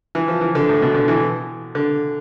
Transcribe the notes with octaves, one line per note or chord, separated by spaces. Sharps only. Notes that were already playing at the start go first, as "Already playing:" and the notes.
E3
F3
E3
D3
A2
B2
D3
E3
D3